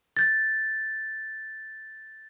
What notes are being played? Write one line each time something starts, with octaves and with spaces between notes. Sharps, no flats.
G6 A6